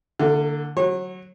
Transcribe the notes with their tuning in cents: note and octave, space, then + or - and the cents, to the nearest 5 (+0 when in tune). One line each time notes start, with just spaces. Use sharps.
D3 +0 A#3 -45 E4 +0
F#3 +0 C#5 -35